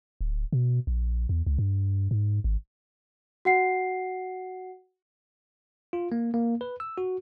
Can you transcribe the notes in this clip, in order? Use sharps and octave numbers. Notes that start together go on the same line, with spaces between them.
D1
B2
A#1
E2
C#2
G2
G#2
G#1
F#4 F#5 C7
F4
A#3
A#3
B4
E6
F#4